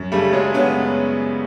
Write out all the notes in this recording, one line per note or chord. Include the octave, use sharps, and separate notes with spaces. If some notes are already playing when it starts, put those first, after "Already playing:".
Already playing: F#2
C#3 G3 A3
F#2 F#3 G#3
C#3 B3 C#4